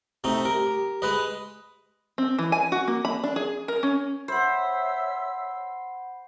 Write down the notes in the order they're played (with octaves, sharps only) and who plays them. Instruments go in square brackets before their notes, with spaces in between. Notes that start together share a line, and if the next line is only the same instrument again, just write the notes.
[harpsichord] C3 A3 D#4
[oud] G4 [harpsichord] A#4
[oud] G4
[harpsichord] G#3 B4 D#5
[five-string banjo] C4
E3
G#5
F#4
A#3
B5
D4
G#4
A#4
C#4
[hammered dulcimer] C5 [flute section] C#5 E5 E6 [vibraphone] F#5 B5